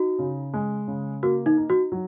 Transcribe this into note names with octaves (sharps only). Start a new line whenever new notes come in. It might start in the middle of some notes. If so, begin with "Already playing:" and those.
Already playing: D#4 F#4
C#3
G#3
C#3
A#3 F#4
D#4
D#4
F#4
F#3